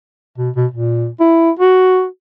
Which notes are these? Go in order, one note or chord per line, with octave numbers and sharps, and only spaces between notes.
B2
B2
A#2
E4
F#4